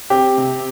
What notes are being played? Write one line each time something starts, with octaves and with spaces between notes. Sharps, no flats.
C4 G4
C3